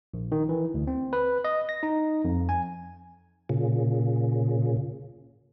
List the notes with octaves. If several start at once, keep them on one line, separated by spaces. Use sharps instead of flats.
A#1
D#3
E3
D2
C4
B4
D#5
A#6
D#4
F2
G#5
A#2 C#3